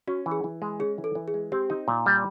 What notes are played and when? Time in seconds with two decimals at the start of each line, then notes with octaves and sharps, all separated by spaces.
0.07 C#4 F#4
0.26 E3
0.31 G#4
0.44 E3
0.62 G#3
0.80 C#4 G#4
0.98 E3
1.04 A4
1.15 E3
1.28 G#4
1.34 G#3
1.52 C4 G4
1.70 D#4
1.88 A#2
2.06 G3